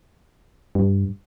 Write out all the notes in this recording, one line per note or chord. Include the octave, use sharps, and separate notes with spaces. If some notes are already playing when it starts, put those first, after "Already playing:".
G2